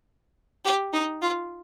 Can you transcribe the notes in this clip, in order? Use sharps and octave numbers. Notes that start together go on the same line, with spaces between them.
G4
D#4
F4